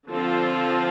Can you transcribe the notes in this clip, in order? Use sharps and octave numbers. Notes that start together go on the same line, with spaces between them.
D3 F3 C4 F4 A4